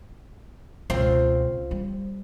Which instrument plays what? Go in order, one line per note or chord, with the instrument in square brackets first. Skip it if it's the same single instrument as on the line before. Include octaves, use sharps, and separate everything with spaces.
[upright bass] C#2 B2 [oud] C4 F4
[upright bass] G3